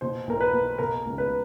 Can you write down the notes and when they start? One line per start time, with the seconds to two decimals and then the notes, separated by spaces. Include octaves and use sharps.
0.01 B2 C5
0.27 B1 A#4
0.41 B4
0.53 B1
0.78 B2 A#4
1.05 C#2
1.18 B4